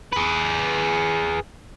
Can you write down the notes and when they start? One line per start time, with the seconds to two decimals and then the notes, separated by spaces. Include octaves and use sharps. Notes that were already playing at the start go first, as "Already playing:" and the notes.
0.13 G#4 B4